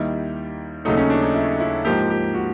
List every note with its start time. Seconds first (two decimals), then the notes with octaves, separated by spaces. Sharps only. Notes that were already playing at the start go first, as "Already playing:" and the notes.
Already playing: D#2 D#3 G3 E4
0.85 D#2 C#3 F#3 A3 D#4
0.98 C#4
1.10 D4
1.22 D#4
1.35 E4
1.60 E4
1.85 G#2 F3 A#3 G4
2.10 G4
2.34 F#4